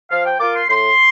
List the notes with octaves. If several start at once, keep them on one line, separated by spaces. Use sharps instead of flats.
F3 F5
G5
A#3 F4 D6
C6
A2 C6